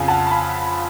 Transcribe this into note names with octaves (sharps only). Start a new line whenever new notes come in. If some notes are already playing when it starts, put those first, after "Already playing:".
Already playing: F2 C#3 F3 F5 G#5
F#5 A5
A5
G#5 B5